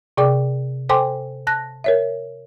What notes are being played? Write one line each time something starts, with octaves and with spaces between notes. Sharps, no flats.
C3 G#4 D5 G5 D6
A4 C5 G5 G#5 C6 D6
A5 F#6 A#6
A#4 C#5 E5